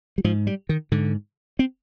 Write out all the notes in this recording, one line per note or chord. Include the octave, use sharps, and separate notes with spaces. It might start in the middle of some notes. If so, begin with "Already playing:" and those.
G3
G#2 F3
G3
D#3
G#2 D3
C4